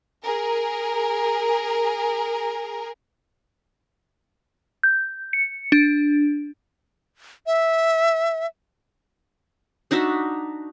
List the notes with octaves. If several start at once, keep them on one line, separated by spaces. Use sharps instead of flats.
G#4 A#4
G6
C#7
D4
E5
D4 D#4 F#4 E5